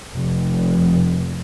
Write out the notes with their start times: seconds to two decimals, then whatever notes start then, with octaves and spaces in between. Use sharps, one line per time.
0.15 F1